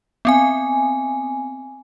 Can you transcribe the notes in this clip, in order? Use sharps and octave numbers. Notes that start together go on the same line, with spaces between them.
B3 C4 G#5